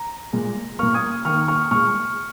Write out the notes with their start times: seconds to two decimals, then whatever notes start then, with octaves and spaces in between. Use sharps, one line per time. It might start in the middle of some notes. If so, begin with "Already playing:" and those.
Already playing: A#5
0.33 A#2 G#3
0.79 A#2 A#3 C#6 F6
0.94 D#6 G#6
1.25 D#3 A#3 C#6 F6
1.48 C#6 F6
1.71 A#2 G#3 C#6 F6